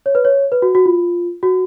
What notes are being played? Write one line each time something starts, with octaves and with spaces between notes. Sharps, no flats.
C#5
B4
C#5
B4
F#4
F#4
F4
F#4